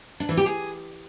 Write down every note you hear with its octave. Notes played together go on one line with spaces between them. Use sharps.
D4
E3
G4
G#4